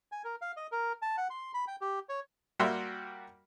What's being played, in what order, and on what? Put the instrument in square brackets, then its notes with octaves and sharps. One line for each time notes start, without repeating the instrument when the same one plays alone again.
[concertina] G#5
A#4
F5
D#5
A#4
A5
F#5
C6
B5
G5
G4
C#5
[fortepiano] G3 A#3 F#4 E5 C6